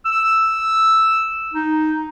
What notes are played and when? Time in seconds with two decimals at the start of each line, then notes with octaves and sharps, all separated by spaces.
0.06 E6
1.54 D#4